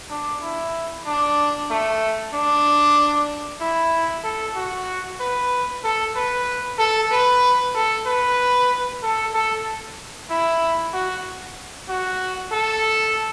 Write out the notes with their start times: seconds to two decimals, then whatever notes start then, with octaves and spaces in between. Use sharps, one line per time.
0.10 D4
0.43 E4
1.06 D4
1.70 A3
2.34 D4
3.61 E4
4.24 A4
4.56 F#4
5.20 B4
5.84 A4
6.16 B4
6.79 A4
7.12 B4
7.75 A4
8.06 B4
9.03 A4
9.34 A4
10.30 E4
10.94 F#4
11.89 F#4
12.52 A4